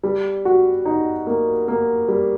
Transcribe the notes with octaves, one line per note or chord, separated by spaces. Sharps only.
G3
F#4
D#4
A#3
A#3
G3